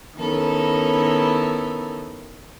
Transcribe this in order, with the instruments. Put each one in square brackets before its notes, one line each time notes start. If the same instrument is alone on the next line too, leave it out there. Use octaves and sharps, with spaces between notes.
[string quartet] D#3 B3 C#4 E4 A4 A#4